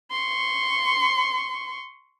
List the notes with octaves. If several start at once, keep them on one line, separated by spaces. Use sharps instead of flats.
C6 C#6